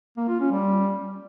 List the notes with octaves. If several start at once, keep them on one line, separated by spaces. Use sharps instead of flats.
A#3
F4
C#4
G3